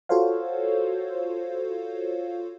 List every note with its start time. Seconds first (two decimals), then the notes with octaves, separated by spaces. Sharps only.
0.09 F4 F#4 A4 C5 C#5 F5